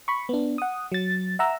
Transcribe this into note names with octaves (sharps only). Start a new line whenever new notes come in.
B5 C#6
B3 D4
F#5 D#6
F#3 A6
E5 F#5 A#5 E6